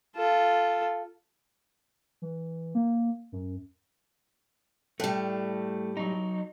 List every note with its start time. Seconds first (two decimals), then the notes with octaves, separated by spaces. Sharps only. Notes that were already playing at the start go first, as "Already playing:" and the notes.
0.16 F4 A4
2.22 E3
2.75 A#3
3.32 F#2
5.00 A2 G3 A3
5.97 F#3 D#4